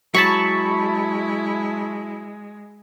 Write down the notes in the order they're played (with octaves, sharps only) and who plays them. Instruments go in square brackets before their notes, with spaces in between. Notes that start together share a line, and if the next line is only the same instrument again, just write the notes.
[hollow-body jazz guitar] F#3 [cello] G#3 [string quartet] E4 [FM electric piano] A5 B5 C#6